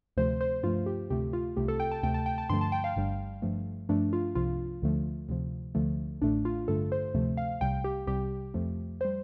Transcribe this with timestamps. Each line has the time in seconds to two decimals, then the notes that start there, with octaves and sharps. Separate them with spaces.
0.17 D2 C3 F3 A3 C5
0.41 C5
0.63 G2 F3 A3 F4
0.86 G4
1.10 D2 C3 A3 G4
1.33 F4
1.57 C2 C3 A3 G4
1.68 A4
1.80 G5
1.92 A5
2.03 D2 C3 A3 G5
2.14 A5
2.26 G5
2.38 A5
2.50 G2 D3 F3 A3 C6
2.61 A5
2.72 G5
2.84 F5
2.96 G1 G2 G3
3.42 G2 F3 A3
3.89 G2 F3 A3 D4
4.13 F4
4.35 C2 C3 F3 F4
4.82 D2 D3 F3 A3
5.29 D2 C3 F3
5.75 D2 D3 F3 A3
6.22 A1 A2 A3 D4
6.45 F4
6.68 G2 D3 A3 A4
6.92 C5
7.14 D2 C3 F3 A3
7.37 F5
7.61 C2 C3 G3 G5
7.84 G4
8.07 C2 C3 G3 G4
8.54 F2 F3 A3
9.01 G3 C5